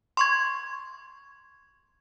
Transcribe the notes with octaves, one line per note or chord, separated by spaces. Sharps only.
C6 C#6 G#6